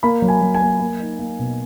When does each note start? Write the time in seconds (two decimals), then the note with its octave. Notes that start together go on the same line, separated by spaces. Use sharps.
0.03 A#3 B5
0.22 F#3
0.28 G#5
0.41 F#3
0.54 G#5
0.61 A#3
0.80 A#3
1.00 D#4
1.19 A#3
1.39 B2